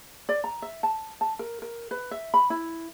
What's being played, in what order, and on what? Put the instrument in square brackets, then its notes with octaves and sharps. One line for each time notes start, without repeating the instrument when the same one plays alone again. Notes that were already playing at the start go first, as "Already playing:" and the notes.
[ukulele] D5
A#5
E5
A5
A5
A#4
A#4
B4
E5
B5
E4